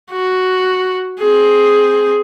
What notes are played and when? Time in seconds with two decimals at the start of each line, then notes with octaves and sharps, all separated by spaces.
0.12 F#4
1.20 C4 G#4